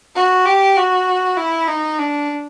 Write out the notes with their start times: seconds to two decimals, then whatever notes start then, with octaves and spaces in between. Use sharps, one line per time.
0.15 F#4
0.46 G4
0.76 F#4
1.37 E4
1.68 D#4
1.99 D4